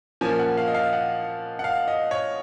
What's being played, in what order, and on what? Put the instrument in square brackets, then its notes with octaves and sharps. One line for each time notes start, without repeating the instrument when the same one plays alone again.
[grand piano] A#2 F3 A#3 C#4 G#5
F#5
F5
D#5
F5
F#5
F#5
F5
D#5
C#5